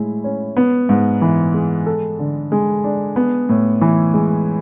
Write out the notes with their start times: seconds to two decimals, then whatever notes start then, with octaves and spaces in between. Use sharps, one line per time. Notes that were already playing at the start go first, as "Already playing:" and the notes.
Already playing: A2 G#3 E4
0.24 C#4
0.57 B3
0.89 G#2
1.22 E3
1.54 G#3
1.86 A4
2.19 D3
2.52 G#3
2.84 D4
3.16 B3
3.49 A2
3.81 E3
4.14 G#3